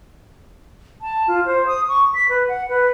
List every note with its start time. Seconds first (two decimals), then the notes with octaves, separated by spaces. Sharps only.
1.01 A5
1.28 F4
1.45 C5
1.67 D#6
1.88 C#6
2.14 B6
2.29 B4
2.48 F#5
2.69 B4